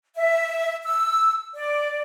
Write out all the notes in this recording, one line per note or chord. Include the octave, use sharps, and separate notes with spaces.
E5
E6
D5